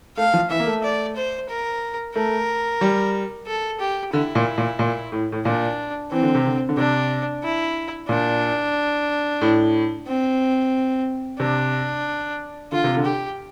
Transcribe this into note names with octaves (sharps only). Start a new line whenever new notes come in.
A3 F5
F3
E3 E5
A#3
A3
D5
C5
A#4
A3 A#4
G3
A4
G4
D3 E4
A#2
A#2
A#2
A2
A2
A#2 D4
E3 C4
D3
C3
D3
D3
C3 D4
E4
A#2 D4
A2
C4
C3 D4
D3 F4
C3
D3
G4